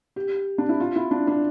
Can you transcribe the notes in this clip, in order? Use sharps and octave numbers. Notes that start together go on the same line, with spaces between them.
G4
D4
E4
F4
E4
D4
D4